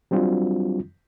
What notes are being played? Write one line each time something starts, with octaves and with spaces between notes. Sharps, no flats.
F#3 G3 C4 D4 F4 F#4